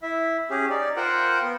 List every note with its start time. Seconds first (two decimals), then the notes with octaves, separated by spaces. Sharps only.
0.02 E4 E5
0.50 C#4 G4 G#4
0.70 D#4 D5
0.97 F4 A#4 C5 F#5 G5
1.42 B3